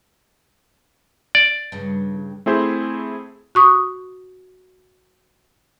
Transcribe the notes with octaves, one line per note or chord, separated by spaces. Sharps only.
D5
G2 C#3
A3 C4 E4 G#4 C5
F#4 C#6 D#6